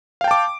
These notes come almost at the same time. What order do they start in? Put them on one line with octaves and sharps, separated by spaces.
F5 G5 A5 D6